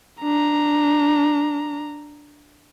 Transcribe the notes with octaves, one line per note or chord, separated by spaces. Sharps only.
D4 A#5